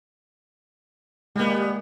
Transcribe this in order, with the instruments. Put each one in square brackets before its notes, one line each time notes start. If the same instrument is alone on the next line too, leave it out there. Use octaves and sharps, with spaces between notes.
[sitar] G3 B3 [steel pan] G#3 A#3